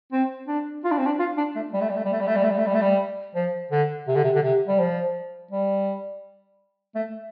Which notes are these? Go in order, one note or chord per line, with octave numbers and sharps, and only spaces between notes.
C4
D4
F4
D4
C4
D4
F4
D4
A3
G3
A3
G3
A3
G3
A3
G3
A3
G3
A3
G3
A3
G3
A3
G3
F3
D3
C3
D3
C3
D3
C3
G3
F3
G3
A3